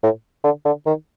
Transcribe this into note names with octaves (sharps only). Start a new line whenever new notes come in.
A2
D3
D3
D#3